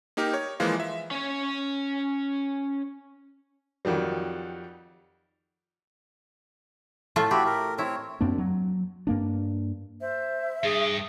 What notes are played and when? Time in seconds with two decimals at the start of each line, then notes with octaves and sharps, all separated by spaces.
0.17 A#3 D#4 G4 A#4
0.34 C#5
0.60 E3 F3 G#3 A#3 F4
0.80 E5
1.11 C#4 C#5
3.85 F2 D#3 F#3 G3
7.16 A2 A3 F4
7.31 E4 F#4 G4 B5
7.46 A#4
7.78 C4 E4 C#5
8.21 F#2 A#3 C4 D4
8.38 F#3
9.07 G2 A#3 D4
10.01 C5 E5
10.64 G2 G#4